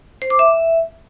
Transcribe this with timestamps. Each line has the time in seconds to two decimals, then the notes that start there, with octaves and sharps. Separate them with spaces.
0.22 C5
0.30 D6
0.39 E5